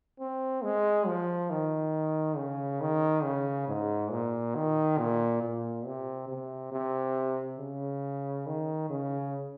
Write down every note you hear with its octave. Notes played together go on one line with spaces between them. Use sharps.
C4
G#3
F3
D#3
C#3
D#3
C#3
G#2
A#2
D#3
A#2
A#2
C3
C3
C3
C#3
D#3
C#3